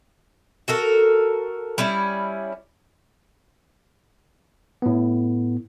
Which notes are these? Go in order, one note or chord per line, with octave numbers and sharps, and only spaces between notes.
F#4 A4 A#4
G3 C#4 E4 D5
A2 B3